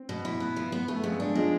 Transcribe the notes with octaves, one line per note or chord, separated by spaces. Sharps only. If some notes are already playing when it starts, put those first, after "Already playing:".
Already playing: C4
B2
E4
B3
F3
B3
A3 B3
F2 G#3
G#3 D4
F3 G#3